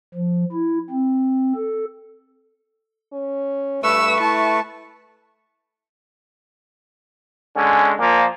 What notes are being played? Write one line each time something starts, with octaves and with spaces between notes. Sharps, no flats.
F3
E4
C4
A4
C#4
G2 A3 B4 C#6 E6
E4 A5
D3 G#3 C#4
A#2 F3 A#3